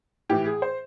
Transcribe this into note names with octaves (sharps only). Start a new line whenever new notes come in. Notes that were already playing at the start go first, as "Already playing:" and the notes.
A2 E3 G4
G#4
C5